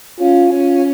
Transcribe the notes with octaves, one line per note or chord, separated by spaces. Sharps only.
C#4 F4
C#4 F4